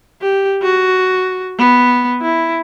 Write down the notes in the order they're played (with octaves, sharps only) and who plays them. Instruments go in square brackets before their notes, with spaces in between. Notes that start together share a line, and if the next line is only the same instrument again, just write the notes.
[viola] G4
F#4
B3
E4